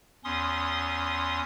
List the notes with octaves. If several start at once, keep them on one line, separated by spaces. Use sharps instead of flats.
E2 C#4 C6 D#6